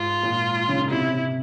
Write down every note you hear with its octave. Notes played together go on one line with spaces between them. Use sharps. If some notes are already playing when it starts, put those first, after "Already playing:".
Already playing: G#2 F4
A#2
C#3
C3 E4
C3